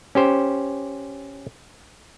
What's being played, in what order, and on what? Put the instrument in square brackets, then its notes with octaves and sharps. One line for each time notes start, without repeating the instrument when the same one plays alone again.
[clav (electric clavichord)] C#4 G4 C5